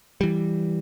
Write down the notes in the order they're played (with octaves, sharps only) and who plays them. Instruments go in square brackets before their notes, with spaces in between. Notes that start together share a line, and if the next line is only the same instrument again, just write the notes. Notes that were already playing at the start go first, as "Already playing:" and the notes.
[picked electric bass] E3 G3